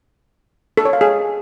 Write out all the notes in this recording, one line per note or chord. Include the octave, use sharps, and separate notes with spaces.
A4
C#5
F5
G#4